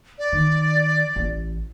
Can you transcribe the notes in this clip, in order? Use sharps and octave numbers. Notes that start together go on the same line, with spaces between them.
D5
D#3
A1